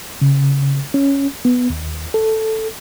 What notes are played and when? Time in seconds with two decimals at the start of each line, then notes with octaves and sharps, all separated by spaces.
0.21 C#3
0.94 C#4
1.45 B3
1.70 D#2
2.14 A4